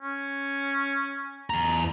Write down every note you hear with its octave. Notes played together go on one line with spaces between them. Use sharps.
C#4
E2 A#5